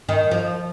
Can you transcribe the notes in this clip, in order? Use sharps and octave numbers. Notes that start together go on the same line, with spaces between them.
D#3
F3